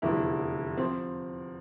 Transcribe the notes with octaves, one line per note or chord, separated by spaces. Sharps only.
F1 E2 D3 F3 E4
F3 C4